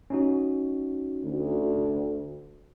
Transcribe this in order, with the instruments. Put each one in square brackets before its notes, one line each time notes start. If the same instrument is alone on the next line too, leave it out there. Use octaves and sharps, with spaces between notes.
[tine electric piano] C#4 D#4 F#4
[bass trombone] D2